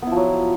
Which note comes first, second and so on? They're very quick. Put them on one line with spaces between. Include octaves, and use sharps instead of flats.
B3 E4 F3 F#3